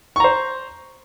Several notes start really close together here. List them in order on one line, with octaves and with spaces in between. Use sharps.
C#6 A#5 C5